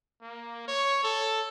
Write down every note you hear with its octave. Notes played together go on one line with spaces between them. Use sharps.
A#3
C#5
A4